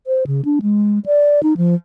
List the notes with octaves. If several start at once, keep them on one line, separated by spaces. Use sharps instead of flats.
C5
C#3
D4
G#3
D5
D#4
F3